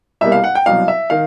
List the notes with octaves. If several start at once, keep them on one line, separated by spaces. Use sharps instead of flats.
C2 B2 G3 A#3 E5
F5
F#5
G5
C2 B2 F#3 F5
E5
D#3 F5